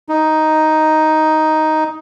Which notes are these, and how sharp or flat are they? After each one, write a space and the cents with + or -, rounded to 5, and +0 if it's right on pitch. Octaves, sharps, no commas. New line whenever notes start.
D#4 +5